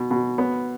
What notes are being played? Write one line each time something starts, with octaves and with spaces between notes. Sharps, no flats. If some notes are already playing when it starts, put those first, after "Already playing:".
Already playing: B2
B2
B3